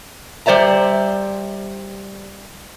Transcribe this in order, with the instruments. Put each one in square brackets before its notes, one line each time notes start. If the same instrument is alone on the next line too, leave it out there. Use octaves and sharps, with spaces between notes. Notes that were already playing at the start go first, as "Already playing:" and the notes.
[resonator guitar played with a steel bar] G3 C5 D5 E5 A#5